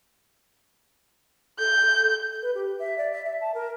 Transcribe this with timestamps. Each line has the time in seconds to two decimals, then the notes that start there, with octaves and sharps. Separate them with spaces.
1.59 A4 G6
2.42 B4
2.55 G4
2.79 E5
2.98 D5
3.12 E5
3.25 E5
3.41 A5
3.54 A#4